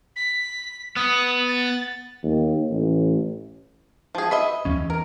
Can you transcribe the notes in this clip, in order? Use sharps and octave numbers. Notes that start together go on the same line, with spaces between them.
B6
B3 D#6
A6
D#2
A1
F3 G#4
D#5 E5 B5
D#2 F3 C#4
E2
A#4